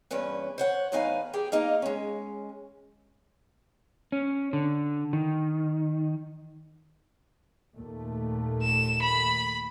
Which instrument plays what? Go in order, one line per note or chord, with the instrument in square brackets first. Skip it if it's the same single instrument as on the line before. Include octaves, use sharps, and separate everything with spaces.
[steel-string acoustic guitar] E2 G2 A#2 C#4 B4
C5 C#5 F#5
E2 A2 D#4 B4 F5 G#5
G4 G#4 G5
A#3 D#4 D#5 F5
G#3 C#4
[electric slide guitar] C#4
D3
D#3
[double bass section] D#2 A#2 A3
[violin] E7
B5